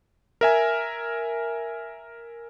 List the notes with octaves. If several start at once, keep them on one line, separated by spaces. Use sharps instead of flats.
A#4 E5 G#5